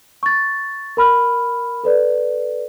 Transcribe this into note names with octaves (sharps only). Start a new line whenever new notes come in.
C#6 A6
A#4 B5 F6
A4 B4 D5